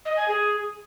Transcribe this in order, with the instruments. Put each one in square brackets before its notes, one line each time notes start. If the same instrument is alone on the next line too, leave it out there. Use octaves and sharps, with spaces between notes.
[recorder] D#5
G#5
G#4